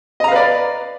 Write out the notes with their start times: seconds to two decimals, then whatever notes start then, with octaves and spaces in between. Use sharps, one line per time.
0.20 D#5
0.24 A#5
0.28 F5
0.32 B4
0.36 D5